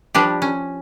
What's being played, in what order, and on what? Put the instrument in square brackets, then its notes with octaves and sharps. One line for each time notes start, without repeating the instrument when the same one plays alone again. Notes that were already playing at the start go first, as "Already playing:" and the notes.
[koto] F3 G3 D4 G4
C#4